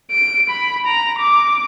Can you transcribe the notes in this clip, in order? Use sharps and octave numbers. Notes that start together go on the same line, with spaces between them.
D7
B5
A#5
D6